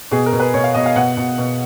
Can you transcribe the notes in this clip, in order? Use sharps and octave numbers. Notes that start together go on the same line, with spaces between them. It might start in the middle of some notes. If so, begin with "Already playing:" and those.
B2 G#4
A#4
B2
B4
B2 C#5
F5
B2 D#5
F5
B2 F#5
B2
B2